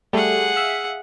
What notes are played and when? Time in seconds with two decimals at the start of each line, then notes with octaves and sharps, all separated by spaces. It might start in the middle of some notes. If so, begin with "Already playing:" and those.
0.13 G3 A3 G#4 F#5
0.56 E5 F5